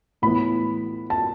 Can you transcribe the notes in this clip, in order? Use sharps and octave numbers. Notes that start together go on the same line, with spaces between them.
A2 E3 B3 B5
A5